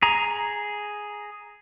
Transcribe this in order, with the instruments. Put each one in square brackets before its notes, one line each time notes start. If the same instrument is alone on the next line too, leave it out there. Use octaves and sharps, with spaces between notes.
[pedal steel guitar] G#4 A#5